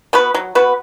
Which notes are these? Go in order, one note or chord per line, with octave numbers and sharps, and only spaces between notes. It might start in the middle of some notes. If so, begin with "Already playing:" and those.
B3 F#4 B4
F#3
B3 F#4 B4